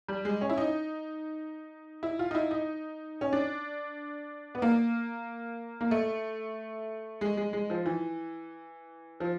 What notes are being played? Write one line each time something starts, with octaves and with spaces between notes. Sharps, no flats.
G3
G#3
C#4
E4
D#4
E4
F4
D#4
E4
D#4
C#4
D4
B3
A#3
A#3
A3
G#3
G#3
G#3
F3
E3
F3